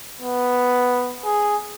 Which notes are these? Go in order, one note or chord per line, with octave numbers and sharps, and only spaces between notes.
B3
G#4